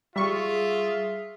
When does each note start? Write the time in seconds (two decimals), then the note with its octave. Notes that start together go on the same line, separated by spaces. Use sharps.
0.16 G3 F4 G#4 E5 C#6